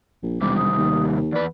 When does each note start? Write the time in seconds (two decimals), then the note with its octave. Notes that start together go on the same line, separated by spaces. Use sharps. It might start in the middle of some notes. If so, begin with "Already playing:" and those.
0.23 A#1
0.41 E1 C3 D#3 G3 D6
0.57 D#6
0.77 D#2
1.32 E2 B4 D5